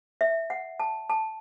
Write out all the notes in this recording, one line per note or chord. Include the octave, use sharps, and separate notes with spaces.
E5
F#5
A5
A5